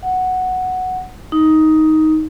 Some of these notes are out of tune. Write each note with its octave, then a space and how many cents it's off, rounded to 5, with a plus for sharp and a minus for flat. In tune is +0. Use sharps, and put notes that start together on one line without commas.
F#5 +0
D#4 +10